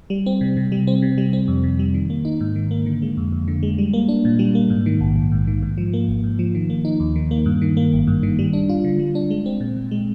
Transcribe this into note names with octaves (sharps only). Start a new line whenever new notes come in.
G3
C4
C3
C3
G3
C4
C3
G3
C4
F2
C3
G3
D#3
A#3
D#4
G#2
D#3
A#3
D3
G#3
F2
F2
D3
G#3
G3
A#3
D4
A#2
G3
A#3
G#2
D#3
A#1
A#1
G#2
D#3
G#2
F3
A#3
G#1
G#2
F3
D#3
A#3
D#4
D#2
D#3
A#3
G2
D#3
A#3
G#1
G2
D#3
G3
D4
F4
D3
G3
D4
G#3
C4
A#2
A#2
G#3